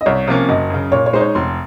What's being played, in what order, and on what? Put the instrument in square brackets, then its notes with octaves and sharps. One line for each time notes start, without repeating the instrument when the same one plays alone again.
[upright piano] D#5
[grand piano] C2 [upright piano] C#5
[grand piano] C3 F3 A#3 C#4
[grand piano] F#1 [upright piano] D#5
[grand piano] F#2 C#3
[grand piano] A#2 [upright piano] C#5
[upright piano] C#5
[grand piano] G#3 D#4 [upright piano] C5
[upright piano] C#5
[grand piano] F1 [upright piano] C6